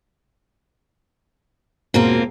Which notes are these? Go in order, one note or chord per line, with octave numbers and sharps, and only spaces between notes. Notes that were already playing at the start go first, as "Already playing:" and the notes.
E1 A#3 C4 F4 F#4 A#5